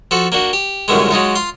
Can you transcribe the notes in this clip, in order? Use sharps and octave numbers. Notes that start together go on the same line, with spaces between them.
F3 F#4 A4
A#3 D4 F#4
G4
C2 F#2 A#2 D3 D#3 G#3
F#3 G#3 D#4 F4
F4 C6